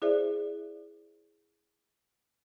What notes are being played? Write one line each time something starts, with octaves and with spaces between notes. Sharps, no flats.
E4 G#4 C5 D5 E5